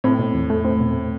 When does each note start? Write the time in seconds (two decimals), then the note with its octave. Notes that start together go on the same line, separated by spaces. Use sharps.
0.04 A2 C4
0.19 B2
0.35 E2
0.50 A3
0.65 C4
0.80 B2